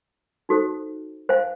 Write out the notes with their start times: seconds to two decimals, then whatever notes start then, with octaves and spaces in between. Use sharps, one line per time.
0.49 D#4 F#4 A4 C5
1.29 C5 F5 G#5